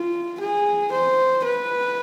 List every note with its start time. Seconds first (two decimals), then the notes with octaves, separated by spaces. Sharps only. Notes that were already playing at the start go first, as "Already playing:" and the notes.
Already playing: F4
0.40 G#4
0.92 C5
1.45 B4